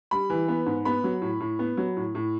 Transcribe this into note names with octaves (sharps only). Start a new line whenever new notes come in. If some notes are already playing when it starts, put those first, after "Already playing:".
G3 B5
E3
B3
G#2
B3 B5
F#3
A2
A2
B3
F#3
A2
A2